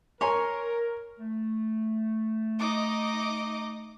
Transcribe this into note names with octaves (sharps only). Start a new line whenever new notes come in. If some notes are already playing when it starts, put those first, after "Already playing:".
A#4 C#5 G#5 A#5 C6 C#6
A3
D#4 D#5 D6